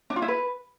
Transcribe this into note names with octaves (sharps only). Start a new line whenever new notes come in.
D4
F4
E4
B4